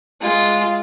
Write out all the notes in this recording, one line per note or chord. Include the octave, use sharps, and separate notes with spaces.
G#3 F4